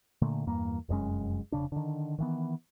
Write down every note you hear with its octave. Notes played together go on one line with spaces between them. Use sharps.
A#2 D3 A3 A#3
E2 G2 A#3
F1 F#2 G#3 C#4
F1 C#3 D4
D3 D#3
D#3 E3 B3